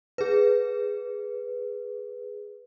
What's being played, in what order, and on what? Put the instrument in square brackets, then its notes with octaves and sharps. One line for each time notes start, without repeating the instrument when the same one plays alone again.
[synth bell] G#4 B4